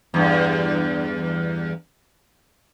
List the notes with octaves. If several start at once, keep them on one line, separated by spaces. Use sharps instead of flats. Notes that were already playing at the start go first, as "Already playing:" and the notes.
E2 G2